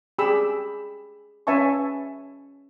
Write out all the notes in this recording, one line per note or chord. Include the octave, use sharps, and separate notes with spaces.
G4 G#4 B5 E6
C#4 B4 E5 G#5 A5 C#6